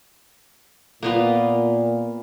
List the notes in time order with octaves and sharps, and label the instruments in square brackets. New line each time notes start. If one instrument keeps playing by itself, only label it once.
[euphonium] A#2 [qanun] A#3 B3 F4